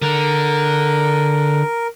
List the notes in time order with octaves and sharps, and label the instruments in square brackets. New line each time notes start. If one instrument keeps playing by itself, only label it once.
[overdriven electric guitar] D3 [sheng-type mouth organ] A#4